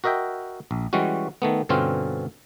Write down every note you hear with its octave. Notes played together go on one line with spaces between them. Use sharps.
F#4 A#4 D#5 E5 G5
A#1
E3 G3 G#3 C#4 F#4
D#3 A3 B3
G2 B2 D3 C4 C#4 F4